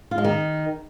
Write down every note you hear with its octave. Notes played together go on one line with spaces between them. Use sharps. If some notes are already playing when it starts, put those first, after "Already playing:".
F4
G#3
D#3